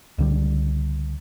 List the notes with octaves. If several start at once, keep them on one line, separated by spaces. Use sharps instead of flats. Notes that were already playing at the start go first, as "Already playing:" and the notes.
C#2 D3 G3